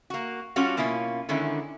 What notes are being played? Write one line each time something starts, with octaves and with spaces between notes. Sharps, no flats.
A#3 F#4
G3 C#4 D4 F4 F#4 A4
B2 A#3 C#4 E4 F4
D3 D#3 G#3 C#4 E4